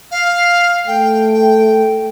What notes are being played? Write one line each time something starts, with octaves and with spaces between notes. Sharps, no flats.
F5
A3 G5
G5